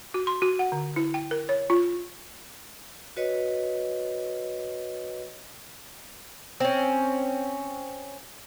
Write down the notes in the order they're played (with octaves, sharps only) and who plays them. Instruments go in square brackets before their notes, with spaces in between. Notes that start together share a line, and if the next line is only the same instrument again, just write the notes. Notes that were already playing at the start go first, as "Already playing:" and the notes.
[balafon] F#4
C6
F#4
F#5
D3
E4
G5
A#4
C#5
F4
[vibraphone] F#4 B4 C#5 D#5
[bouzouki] C4 C#4